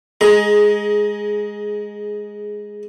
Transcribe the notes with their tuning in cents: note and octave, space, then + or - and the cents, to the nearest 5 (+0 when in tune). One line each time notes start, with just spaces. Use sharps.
G#3 +0 G#4 +10 A#5 +25